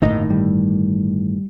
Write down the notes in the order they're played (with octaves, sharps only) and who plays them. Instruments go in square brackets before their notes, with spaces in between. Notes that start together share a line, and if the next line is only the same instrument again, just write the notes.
[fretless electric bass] G1 A2 D#3 [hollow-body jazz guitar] D#2 D#4 D#5
[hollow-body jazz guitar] G3